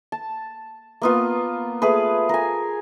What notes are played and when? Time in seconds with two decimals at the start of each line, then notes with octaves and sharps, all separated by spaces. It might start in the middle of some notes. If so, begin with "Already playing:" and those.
0.12 A5
1.02 A#3 B3 F4
1.82 A3 G#4 B4
2.29 A#4 G#5